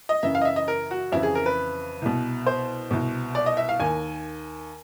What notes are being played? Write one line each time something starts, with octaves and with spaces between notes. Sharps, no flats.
D#5
F#2 C#3 E3 E5
F5
D#5
E5
D#5
A#4
F#4
F2 C#3 E3 E4
G#4
A#4
B4
C2 B2
C5
C2 B2
D5
D#5
E5
F5
D#2 D#3 G#5